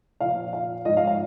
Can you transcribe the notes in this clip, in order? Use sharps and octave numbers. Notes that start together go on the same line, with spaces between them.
A#2 F3 F5
F5
G#2 F3 D#5
F5
F5